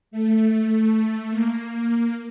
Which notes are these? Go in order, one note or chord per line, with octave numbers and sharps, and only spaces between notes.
A3
A#3